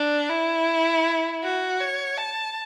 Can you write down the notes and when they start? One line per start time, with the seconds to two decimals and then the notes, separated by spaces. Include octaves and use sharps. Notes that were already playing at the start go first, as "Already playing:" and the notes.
Already playing: D4
0.29 E4
1.43 F#4
1.80 C#5
2.17 A5